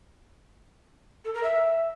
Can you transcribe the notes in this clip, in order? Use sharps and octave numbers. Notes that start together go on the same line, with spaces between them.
A4
A#4
E5